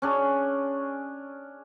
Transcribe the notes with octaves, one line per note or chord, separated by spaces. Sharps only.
C#4 D4 G#4